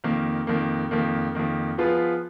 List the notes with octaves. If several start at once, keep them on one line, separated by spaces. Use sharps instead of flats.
F2 D#3 A#3
F2 D#3 A#3
F2 D#3 A#3
F2 D#3 A#3
F3 B3 F4 G#4 B4